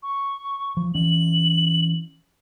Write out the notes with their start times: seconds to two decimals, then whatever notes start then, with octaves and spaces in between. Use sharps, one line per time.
0.03 C#6
0.77 F3
0.94 E3 C#4 F#7